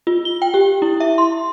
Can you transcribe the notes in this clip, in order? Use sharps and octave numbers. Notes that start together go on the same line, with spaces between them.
F4
G7
G5
G4
E4
E5
C6